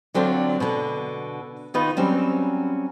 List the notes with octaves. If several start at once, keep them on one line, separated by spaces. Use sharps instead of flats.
D3 F#3 C4 D4 F4
B2 D3
D#3 B3 D#4 F4 B4
F#3 G3 C4 C#4